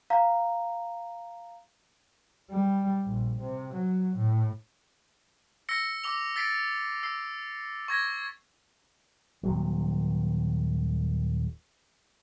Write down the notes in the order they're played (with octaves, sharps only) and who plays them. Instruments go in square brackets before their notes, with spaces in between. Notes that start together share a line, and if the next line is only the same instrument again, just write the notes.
[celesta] F5 A#5
[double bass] G3
A#1
C3
F#3
A2
[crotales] E6 A#6 C#7
D6 E6 F7
E6 A6 B6 C7 D7
E6 C7
C#6 G#6 A#6
[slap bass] D#1 C3 F#3